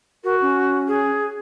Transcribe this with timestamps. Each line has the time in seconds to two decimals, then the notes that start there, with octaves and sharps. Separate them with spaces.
0.24 F#4 A#4
0.42 C#4
0.87 G#4